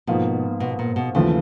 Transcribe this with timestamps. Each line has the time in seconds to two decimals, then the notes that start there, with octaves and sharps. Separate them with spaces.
0.07 G#2 B2 F3 A#3 D#4
0.60 B2
0.79 A#2
0.96 B2
1.15 D#2 C#3 E3 F3 A3